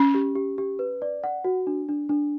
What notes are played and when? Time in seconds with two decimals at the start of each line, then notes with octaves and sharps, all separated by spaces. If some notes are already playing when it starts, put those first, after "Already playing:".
Already playing: C#4
0.14 G4
0.35 G4
0.58 G4
0.79 B4
1.02 D5
1.24 F#5
1.44 F#4
1.67 D4
1.89 D4
2.09 D4